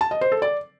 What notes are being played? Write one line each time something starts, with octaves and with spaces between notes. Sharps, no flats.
A5
D#5
C5
A4
D5